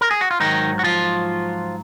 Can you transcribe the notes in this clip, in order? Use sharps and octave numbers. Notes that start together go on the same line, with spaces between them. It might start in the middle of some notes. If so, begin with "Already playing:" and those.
A#4
G#4
F#4
F4
G#2 D#3 F#3 D#4
F#4
F3 F4